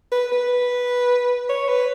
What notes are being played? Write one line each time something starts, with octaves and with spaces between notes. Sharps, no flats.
B4
B4
C#5
B4